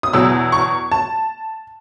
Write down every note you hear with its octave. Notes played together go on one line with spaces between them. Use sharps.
D#6
E2 B2 F#3 E6
C#6
A5